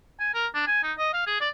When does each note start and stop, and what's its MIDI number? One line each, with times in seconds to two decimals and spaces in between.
0.20 0.33 80
0.34 0.47 70
0.54 0.67 62
0.68 0.83 80
0.83 0.93 63
0.98 1.10 75
1.13 1.26 77
1.27 1.38 68
1.41 1.49 74